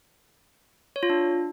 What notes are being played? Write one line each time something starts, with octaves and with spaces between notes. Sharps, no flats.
C#5
F4
D4